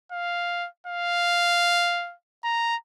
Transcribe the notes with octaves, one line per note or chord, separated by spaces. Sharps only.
F5
F5
A#5